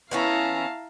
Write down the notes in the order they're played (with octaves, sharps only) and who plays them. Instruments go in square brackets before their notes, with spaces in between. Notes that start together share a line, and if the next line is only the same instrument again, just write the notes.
[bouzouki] E3 B3 C#4 [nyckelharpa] E4 A#5 [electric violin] F5 A5